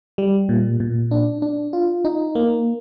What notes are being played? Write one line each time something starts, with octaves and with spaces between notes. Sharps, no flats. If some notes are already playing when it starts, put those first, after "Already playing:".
G3
A#2
A#2
D4
D4
F4
D#4
A#3